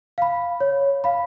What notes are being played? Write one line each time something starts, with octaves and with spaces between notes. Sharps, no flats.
F5 B5
C#5
F5 B5